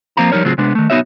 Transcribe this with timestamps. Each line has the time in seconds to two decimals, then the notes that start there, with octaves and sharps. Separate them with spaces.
0.17 F3 A#3 C4 F4 A#5
0.32 F3 G3 D#4 A#4 C#5
0.45 A2 C#3 F#3 C4 F4 G#4
0.58 C3 G#3 B3 D4
0.75 D#3 A3
0.90 B1 B3 D#4 F#4 C#5 E5